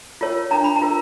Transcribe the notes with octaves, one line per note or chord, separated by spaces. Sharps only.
F4 A#4 C#5
D4 A#5
B5
A#5
F4 A#4